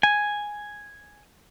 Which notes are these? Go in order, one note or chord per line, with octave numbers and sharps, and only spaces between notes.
G#5